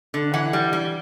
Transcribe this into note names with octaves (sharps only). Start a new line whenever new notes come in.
D3
E3 F#5
G3
G3